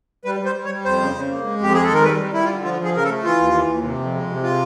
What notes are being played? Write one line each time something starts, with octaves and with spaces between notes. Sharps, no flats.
G3 B4
G3 C5
G3
C#5
G3
F2 C5
C#3
C#3
A#3
G#3
F2 G4
G#3 G#4
A4
D#3 A#4
G3 B4
G3
G3 E4
F4
D3
F3 F4
F3 G#4
C#3 A#4
A4
A3
E3 F4
D#2
E3
D#2
C3
F2
G#3
C3
F4